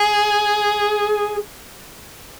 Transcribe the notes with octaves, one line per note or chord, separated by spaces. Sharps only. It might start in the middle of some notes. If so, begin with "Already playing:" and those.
Already playing: G#4